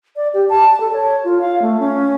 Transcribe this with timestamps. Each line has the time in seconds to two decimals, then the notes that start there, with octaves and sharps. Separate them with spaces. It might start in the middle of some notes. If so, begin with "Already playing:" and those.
0.16 D5
0.34 G4
0.49 A5
0.80 A4
0.93 C#5
1.24 F4
1.41 F5
1.62 A3
1.80 C#4